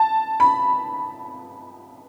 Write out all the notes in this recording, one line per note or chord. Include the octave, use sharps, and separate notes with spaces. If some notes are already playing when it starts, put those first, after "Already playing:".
Already playing: A5
B5